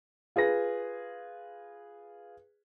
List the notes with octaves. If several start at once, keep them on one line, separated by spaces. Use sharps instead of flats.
F4 G#4 B4 A#6